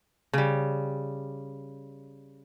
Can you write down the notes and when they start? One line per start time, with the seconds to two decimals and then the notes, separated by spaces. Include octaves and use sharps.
0.33 C#3 G3